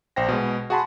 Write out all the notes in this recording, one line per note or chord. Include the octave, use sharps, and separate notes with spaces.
A#1 C5 G5 A#6
B2 G#3
F#4 G#4 F#5 A5 B5 C6